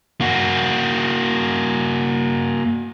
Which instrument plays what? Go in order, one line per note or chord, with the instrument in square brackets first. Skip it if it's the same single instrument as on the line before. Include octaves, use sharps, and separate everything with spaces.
[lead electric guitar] A#3 F#4